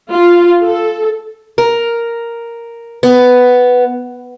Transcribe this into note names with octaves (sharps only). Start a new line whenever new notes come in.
F4
A4
A#4
B3